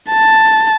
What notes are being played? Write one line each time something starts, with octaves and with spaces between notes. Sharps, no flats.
A5